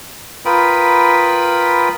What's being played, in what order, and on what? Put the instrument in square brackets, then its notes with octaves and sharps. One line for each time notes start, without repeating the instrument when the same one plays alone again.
[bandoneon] F4 A#4 B4 G5 B5 D#6